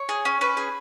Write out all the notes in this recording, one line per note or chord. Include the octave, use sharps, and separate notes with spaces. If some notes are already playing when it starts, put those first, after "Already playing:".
Already playing: C#5
G#4
C#4
C#4 B4
G#4